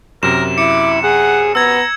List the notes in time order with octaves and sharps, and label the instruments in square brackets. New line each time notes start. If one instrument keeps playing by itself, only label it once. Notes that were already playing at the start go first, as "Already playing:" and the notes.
[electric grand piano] F#2 C3 [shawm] A#4 [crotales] E7
[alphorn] E4 [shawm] D6 [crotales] C#7
[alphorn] G#4 [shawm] F#5
[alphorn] B3 [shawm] A#5 [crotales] E6 G#6